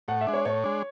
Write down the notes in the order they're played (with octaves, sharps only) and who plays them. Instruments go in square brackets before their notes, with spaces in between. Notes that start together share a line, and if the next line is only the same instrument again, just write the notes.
[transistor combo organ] A2 [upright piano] F#5
[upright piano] E5
[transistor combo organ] G#3 D4
[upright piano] C#5
[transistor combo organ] A2 [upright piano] C#5
[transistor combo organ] G#3 D4